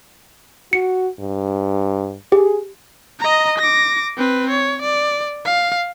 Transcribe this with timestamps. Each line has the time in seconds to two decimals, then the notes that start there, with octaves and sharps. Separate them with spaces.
0.73 F#4 C#7
1.20 G2
2.32 G4 G#4
3.20 D#5 A#5
3.58 D6 A#6
4.17 C4 B4
4.51 C#5
4.82 D5
5.45 F5